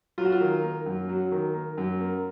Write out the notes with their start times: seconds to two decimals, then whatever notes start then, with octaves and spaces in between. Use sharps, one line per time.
0.18 F#3 F4
0.25 F#4
0.32 F4
0.41 D#3
0.64 A#3
0.86 F#2
1.09 F#3
1.32 D#3
1.55 A#3
1.78 F#2
2.00 A#3